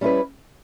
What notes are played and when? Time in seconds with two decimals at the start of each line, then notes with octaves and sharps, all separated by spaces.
0.01 G3 C#4 E4 B4